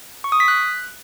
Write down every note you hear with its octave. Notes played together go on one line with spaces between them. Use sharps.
C#6
D#6
B6
F#6